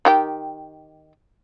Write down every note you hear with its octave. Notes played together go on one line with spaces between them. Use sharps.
D#3 G4 G5